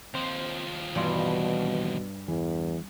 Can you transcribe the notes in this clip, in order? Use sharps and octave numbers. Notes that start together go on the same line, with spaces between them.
D#2 F3 C4 C5
G2 B2 E3 D5 C6
E2 E3